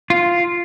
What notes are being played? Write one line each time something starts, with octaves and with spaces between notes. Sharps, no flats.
F4